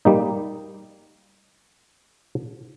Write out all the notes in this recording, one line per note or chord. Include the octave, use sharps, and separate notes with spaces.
G3 A#3 D#4